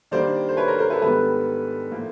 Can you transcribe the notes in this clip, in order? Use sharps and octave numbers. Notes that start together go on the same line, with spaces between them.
D#3 G3 A#3 D4 C5 D5
C5
B4 C#5
A#4 C5
A#4 C5
A4 B4
G#2 D#3 G3 B3 D4 A4 B4
A2 F3 A#3